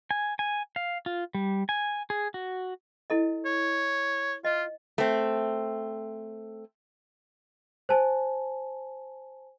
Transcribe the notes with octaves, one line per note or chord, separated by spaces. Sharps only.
G#5
G#5
F5
F4
G3
G#5
G#4
F#4
E4 A4 D#5
C#5
F4 D#5
A3 C4
C5 G#5 A5